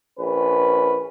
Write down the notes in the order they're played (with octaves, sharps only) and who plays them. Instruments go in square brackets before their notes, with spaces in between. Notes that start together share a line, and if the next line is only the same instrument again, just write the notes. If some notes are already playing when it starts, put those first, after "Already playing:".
[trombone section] A#1 C#4 B4